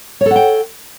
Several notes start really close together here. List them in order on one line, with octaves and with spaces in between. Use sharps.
C#5 A4 F#5 G5